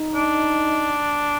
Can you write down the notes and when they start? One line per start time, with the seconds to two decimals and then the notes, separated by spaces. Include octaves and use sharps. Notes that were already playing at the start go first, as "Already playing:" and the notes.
Already playing: D#4
0.15 D4